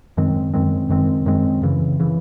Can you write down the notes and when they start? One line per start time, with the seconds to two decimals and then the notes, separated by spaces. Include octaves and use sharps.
0.17 F#2 D#3 G#3 C4
0.54 F#2 D#3 G#3 C4
0.89 F#2 D#3 G#3 C4
1.25 F#2 D#3 G#3 C4
1.62 F#2 C#3 E3
2.00 C#3 E3